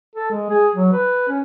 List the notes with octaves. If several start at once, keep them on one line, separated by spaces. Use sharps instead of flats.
A4
G#3
G#4
F#3
B4
C#4